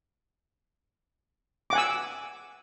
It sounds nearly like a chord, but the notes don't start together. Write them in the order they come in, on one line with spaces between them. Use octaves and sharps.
D6 F#5 G#5 E6